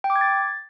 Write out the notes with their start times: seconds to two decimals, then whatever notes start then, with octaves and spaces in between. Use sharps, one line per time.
0.04 G5
0.10 D6
0.16 G#6
0.21 A6